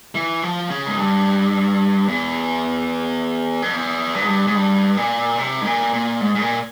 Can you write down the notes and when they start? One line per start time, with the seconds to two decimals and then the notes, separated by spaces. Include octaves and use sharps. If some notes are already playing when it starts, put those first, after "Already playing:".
0.15 E3
0.43 F3
0.70 C#3
0.86 G#2
0.97 G2
2.08 E2
3.62 F2
3.73 E2
4.14 G2
4.21 G#2
4.28 G2
4.47 G#2
4.56 G2
4.97 A#2
5.38 C3
5.61 G#2
5.66 A#2
5.93 A#2
6.21 G#2
6.35 G#2
6.41 A#2